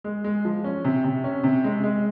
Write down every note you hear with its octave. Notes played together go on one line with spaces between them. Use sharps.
G#3
G#3
F3
C#4
C3
C3
C#4
C3
G#3
G#3